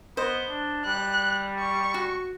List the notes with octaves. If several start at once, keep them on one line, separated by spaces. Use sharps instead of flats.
B3 C5 D#5
D4
G3 F#6
C#6
F#4